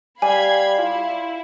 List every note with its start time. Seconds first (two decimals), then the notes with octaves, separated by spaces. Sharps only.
0.22 G3 F5 G#5 B5 G#6
0.78 E4 F4